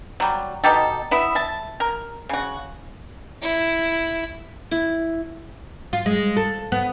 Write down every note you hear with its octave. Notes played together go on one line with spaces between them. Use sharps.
F#3 G3
B2 D#4 G4 A4
B3 E4 E5
E5 A5
A#4
C#3 F#4
E4
E4
F4
G#3
A4
B3